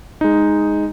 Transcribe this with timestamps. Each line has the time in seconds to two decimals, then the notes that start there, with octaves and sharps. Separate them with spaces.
0.21 G#3 D#4